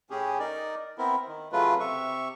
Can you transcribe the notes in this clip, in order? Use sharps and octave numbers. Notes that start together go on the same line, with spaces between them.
A2 C#4 G4 G#4
D#4 A#4 D5
B3 C4 E4 A#4
D#3
C#3 F#3 A3 F4 B4
C3 E5 C#6